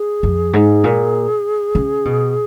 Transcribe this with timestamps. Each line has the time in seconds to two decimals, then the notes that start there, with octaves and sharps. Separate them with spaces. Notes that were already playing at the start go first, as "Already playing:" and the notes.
Already playing: G#4
0.23 F2
0.53 G#2
0.84 A#2
1.75 C#3
2.05 B2